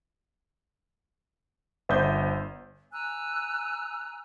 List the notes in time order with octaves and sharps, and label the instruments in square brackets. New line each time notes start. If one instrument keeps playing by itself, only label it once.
[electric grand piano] G1 [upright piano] C5 E5 G6
[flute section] G#5 A#5 E6 F#6